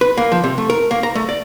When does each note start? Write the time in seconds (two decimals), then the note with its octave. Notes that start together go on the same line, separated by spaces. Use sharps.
0.01 B4
0.18 A#3
0.32 F3
0.44 C3
0.58 A3
0.70 A#4
0.91 A#3
1.03 A#5
1.15 A3
1.29 D5